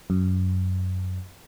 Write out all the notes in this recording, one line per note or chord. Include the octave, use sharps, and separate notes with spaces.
F#2